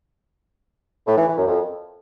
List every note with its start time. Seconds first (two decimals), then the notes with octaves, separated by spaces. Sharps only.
1.07 A2
1.17 E3
1.27 E3
1.37 F#2
1.47 F2